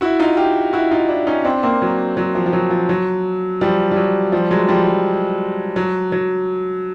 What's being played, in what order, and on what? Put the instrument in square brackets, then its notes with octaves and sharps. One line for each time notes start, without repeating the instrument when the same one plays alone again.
[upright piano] E4 F#4
D#4 F4
F4 G4
E4 F#4
D#4 F4
D4 E4
C#4 D#4
C4 D4
A#3 C4
F#3
F#3
F3
F3
F#3
F3
F#3
F3 G3
G3
F#3
F3 G3
F#3 G#3
F3 G3
F3
F#3
F#3